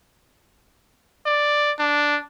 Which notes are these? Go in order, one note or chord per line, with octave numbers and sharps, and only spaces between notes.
D5
D4